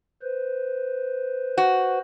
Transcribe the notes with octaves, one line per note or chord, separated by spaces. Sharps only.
B4 C5
F#4